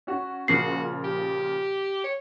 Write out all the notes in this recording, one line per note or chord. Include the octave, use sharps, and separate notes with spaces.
C#4 F#4
A#2 C#3 F3 F#4 C7
G4
C#5